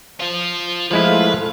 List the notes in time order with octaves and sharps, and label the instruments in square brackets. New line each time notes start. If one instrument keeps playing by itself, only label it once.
[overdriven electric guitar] F3 F4
[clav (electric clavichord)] F3 G#3 E4 [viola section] A3 F4 F5 [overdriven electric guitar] B4